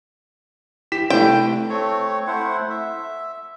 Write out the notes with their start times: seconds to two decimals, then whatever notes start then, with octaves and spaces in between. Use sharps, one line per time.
0.92 E4 G4 B6 E7
1.10 C3 A3 C4 E4 G5
1.69 A3 C4 C#5
2.27 A3 E4 C5 F#5
2.70 E5